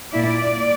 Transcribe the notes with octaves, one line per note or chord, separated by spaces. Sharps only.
A#2 A#3 E4 D5